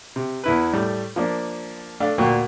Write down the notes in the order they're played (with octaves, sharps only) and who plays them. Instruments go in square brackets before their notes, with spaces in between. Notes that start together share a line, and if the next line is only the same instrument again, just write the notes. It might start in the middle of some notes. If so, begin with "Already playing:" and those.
[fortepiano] C3
E2 E4 B4
A2 G3 A3
F3 A#3 D4
A3 D4 F5
D2 A#2 F#3 A#3 G5 C#6